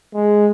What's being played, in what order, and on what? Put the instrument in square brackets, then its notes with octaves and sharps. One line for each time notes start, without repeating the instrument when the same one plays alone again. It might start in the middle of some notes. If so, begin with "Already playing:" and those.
[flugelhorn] G#3